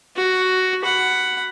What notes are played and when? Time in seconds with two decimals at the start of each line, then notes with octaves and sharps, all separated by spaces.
0.16 F#4
0.83 F#5 B5